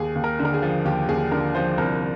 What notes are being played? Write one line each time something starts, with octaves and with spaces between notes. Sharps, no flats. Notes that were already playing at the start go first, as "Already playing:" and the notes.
Already playing: D#2 G#4
D#2
A#4
D3
A#4
G#4
F3
D#2 G4
D#2 G#4
D3 A#4
F3 C5
C2 A#4